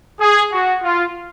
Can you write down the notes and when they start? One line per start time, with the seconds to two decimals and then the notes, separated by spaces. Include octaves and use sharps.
0.20 G#4
0.52 F#4
0.82 F4